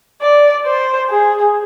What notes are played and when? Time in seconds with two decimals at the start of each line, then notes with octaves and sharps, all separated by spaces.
0.21 D5
0.66 C5
1.10 G#4